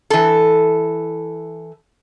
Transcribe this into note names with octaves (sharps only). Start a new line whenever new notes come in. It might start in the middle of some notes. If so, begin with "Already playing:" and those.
E3 A4